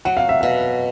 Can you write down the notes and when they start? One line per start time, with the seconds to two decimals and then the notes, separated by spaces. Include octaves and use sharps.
0.05 F#3 F#5
0.17 F5
0.29 E5
0.41 B2 F5